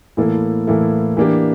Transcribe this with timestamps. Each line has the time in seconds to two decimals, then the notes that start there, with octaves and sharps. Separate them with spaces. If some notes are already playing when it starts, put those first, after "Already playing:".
0.17 A2 E3 A#3 E4 A4
0.67 A2 E3 A#3 E4 A4
1.17 E3 A#3 D4 G4